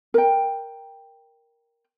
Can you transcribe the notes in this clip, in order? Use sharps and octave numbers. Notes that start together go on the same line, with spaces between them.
A#4 G5